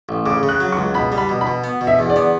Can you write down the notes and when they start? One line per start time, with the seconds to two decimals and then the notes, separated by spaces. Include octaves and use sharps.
0.09 A1
0.26 C#3 D6
0.43 C#3
0.49 F#6
0.60 F#3
0.72 C#6
0.77 C#2
0.94 B2 B5
1.12 G3
1.18 B5
1.29 B2
1.41 B5
1.47 B2
1.64 B3
1.81 B2
1.87 E5
1.99 E2
2.10 D5
2.16 B3